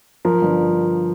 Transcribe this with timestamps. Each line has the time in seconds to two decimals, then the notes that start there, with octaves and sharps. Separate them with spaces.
0.25 F3 A#4
0.42 G1